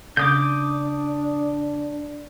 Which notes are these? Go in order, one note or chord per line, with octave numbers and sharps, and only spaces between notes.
C#3 D4 D6 D#6 G6